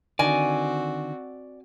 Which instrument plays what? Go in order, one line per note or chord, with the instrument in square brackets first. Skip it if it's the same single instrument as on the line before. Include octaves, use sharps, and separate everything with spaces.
[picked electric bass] D3 D#3 [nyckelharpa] C4 F#4 [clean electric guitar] D5 [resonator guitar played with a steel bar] D#5 G#5